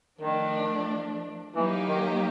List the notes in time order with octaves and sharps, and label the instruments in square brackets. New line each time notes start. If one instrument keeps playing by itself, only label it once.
[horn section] D#3 [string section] F3 A3 D4
[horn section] E3 [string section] F#3 A#3 D#4 G4
[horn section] D#3